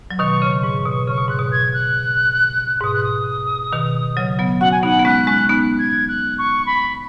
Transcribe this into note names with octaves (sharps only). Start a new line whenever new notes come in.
F#3
B2 D#3 C#6
C#3
G#2 C#6
B2
C#3 C#6
B2
G#2 F#6
B2
G#6
F#6
G#2
B2 D#6
F#6
D#6
B2 D#3
C#3 F#3
F#3 B3
C#4 F#4 F#5
G#5
B3 D#4 F#5
B3
G#3 C#4 F#6
G#3 C#4
B3 D#4 F#6
G#6
F#6
C#6
B5